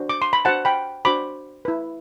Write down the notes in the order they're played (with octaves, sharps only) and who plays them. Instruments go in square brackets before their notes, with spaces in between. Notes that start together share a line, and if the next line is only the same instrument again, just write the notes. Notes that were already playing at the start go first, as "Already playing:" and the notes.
Already playing: [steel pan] D4 F#4 C5
D6
C6
B5
D4 F#4 C5 F#5 A5
G5 B5
D4 F#4 C5 B5 D6
E4 B4